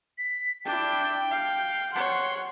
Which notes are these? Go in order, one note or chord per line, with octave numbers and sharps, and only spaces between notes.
B6
D4 E4 G5
F5
C#5 F#5 C6